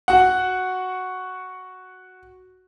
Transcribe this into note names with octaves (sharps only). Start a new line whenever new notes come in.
F#4 F#5